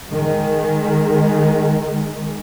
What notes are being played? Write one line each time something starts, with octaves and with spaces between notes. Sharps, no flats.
D#3 G#3